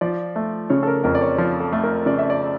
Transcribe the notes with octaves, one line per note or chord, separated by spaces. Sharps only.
F3 D5
A3
C#3 C#5
A4
A#4
F2 A#4
D5
C#5
F3
A4
A3
A#4
C#3 D5
E5
D5